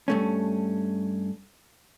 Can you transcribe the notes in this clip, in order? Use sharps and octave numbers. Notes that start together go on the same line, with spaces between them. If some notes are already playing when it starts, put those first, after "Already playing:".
G2 A3 C#4